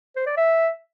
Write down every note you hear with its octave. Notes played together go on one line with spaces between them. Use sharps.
C5
D5
E5